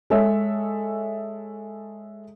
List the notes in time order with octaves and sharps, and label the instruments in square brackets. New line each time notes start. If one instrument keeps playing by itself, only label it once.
[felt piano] G#3 A4 C#5 E5